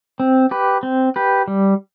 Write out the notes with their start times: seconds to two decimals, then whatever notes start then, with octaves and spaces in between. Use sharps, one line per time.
0.20 C4
0.51 G4 B4
0.83 C4
1.16 G4 B4
1.48 G3